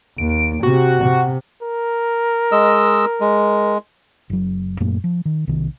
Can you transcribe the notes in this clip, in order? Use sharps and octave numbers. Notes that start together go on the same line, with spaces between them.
D#2 D7
C3 F#4
C3
A#4
G#3 D#5 E6
G#3
F#1 F#3
F#2 A#2 A3 A#3
F3
D#3
B1 C3 D#3